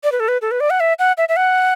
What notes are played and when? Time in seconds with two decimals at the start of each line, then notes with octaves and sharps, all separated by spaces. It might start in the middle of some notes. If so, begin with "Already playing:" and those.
0.04 D5
0.12 B4
0.20 A4
0.28 B4
0.42 A4
0.51 B4
0.60 D5
0.70 F#5
0.80 E5
0.99 F#5
1.18 E5
1.29 E5
1.36 F#5